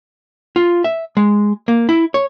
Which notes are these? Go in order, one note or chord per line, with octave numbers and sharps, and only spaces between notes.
F4
E5
G#3
A#3
E4
C#5